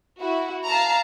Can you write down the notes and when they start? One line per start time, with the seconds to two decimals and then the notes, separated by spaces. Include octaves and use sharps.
0.19 E4 F#4
0.66 F5 A5 A#5